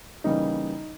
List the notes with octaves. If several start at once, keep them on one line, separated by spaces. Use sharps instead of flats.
C#3 E3 G3 A#3 D#4